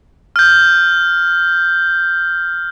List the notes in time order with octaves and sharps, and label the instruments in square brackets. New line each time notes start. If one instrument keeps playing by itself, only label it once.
[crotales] F6 G6